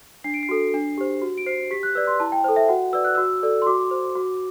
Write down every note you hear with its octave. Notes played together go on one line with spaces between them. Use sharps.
D4 C7
D7
C7
F#4 A4
D4
G4 C5
F#4
D7
C5 C7
G4 B6
F#6
B4 D5 E6
C6
E4 A5
G5
A4 C5
E5
F#4 F#5
B4 D5 E6
F#6
F#4 E6
A4 D5
C6
F#4 D6
C5
F#4